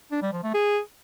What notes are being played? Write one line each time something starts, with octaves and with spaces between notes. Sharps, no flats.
D4
G3
F3
A3
G#4